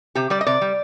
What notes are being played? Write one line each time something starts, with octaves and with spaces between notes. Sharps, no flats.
C3 G4
G3 D5
D#5
C3 D5
G3